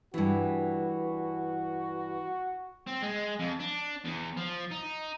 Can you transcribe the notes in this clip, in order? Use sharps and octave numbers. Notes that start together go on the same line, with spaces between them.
G2 E3 F#4
C4
G#3
F2
D4
E2
F3
D#4